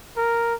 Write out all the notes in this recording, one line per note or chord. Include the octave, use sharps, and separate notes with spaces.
A#4